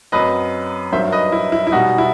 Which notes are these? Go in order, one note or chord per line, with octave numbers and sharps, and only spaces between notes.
F#2 F#3 C4 B4 D#5
G2 D#3 F#3 C5 E5
B4 D#5
E4
E4
E4
B2 G3 B3 D#4 F#4
E4